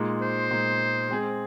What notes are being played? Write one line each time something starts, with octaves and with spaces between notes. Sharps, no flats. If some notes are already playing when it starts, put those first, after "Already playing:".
Already playing: A#2 G#3 D#4
C5
A#2 G#3 D#4
G#3 C4 G#4